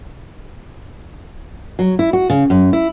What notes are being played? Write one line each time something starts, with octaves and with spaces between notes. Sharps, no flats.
F#3
E4
F#4
C#3
F#2
E4